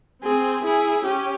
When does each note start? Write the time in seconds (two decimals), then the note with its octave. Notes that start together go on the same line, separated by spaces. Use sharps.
0.23 C4 G#4
0.65 E4 G#4
1.06 C#4 G4